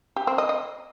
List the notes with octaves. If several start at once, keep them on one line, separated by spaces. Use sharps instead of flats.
G4
C4
D#5
D#5